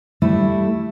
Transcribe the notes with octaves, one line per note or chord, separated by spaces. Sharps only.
G3 A3 E4